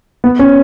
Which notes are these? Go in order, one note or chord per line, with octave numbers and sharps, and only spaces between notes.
B3
C#4